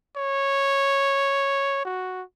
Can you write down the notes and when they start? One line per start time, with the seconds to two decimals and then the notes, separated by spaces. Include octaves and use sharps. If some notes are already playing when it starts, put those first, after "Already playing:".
0.16 C#5
1.85 F#4